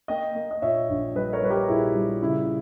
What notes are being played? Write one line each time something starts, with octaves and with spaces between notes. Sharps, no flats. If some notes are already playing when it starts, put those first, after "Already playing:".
A#3 D#5 G5
A#3
D#5
A#2 C#5 E5
A#1
G3 B4 D#5
A#4 C#5
G3 B4
G4 A#4
A#2 E4 G#4
G3
C#3 E4